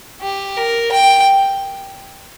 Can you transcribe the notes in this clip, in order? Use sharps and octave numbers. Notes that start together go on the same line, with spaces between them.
G4
A#4
G5